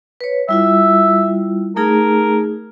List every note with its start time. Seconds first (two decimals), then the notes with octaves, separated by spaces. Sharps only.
0.21 B4 C#5
0.49 G3 E4 F4 E5
1.76 A3 D#4 G#4 A#4